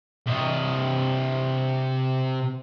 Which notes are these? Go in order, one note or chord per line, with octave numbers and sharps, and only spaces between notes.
C3 D#5